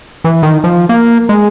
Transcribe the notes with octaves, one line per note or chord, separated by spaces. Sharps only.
E3
D#3
F3
A#3
G#3